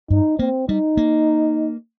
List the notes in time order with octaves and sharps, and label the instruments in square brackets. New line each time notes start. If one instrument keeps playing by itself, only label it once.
[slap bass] G2 [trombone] D#4
[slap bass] A#3 [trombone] C4
[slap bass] G3 [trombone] D#4
[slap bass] A#3